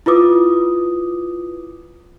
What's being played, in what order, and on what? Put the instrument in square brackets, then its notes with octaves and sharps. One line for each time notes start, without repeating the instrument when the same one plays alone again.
[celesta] E4 F4 B4 D6 D#6